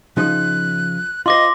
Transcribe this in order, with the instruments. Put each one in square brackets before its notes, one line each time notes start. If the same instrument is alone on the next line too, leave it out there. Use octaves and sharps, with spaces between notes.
[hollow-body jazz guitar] C#3 F3 D#4 [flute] F#6
[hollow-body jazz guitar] F4 C5 [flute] D#5 [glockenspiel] C6 D6 A#6